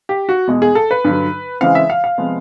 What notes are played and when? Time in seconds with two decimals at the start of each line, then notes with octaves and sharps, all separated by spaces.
0.09 G4
0.29 F#4
0.47 E2 B2 G#3
0.62 G#4
0.75 A4
0.91 B4
1.04 G2 D3 F#3
1.61 C#3 E3 G#3 C4 F5
1.75 E5
1.90 F5
2.04 F5
2.18 C3 F3 G#3 B3